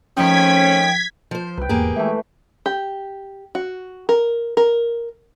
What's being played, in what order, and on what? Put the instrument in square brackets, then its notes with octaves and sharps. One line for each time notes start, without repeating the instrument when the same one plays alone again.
[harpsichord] D#3 F3 [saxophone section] A3 C4 C#4 [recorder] G5 [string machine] G#6 B6
[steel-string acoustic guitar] F3 C5
[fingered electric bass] C2 [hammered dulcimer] B4 G5
[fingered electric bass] D#1 E2 G#2 [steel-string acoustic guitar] A#3 G4 G#4
[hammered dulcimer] E3 A3 [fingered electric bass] G#3
[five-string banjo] G4
F#4
A#4
A#4